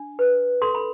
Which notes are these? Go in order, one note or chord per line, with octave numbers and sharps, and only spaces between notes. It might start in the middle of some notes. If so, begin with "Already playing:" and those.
Already playing: D4
B4
A4 C6
B5